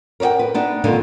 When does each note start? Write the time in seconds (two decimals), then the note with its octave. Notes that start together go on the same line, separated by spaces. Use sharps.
0.20 A#4 C#5 D5 F#5 G5
0.39 B4
0.54 B3 D4 D#4
0.84 F2 G#2 D3 D#3 A#3 D#4